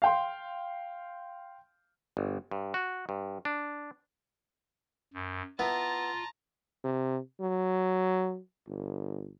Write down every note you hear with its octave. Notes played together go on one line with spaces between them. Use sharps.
F5 G5 C6
G1
G2
F#4
G2
D4
F#2
B3 E4 F4 A5 A#5
C3
F#3
G1